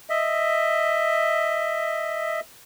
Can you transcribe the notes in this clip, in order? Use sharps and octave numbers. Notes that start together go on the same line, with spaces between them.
D#5 E5